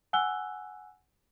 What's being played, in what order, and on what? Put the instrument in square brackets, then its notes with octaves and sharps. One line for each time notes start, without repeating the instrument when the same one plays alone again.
[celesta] F#5 G#5 E6 F#6 G7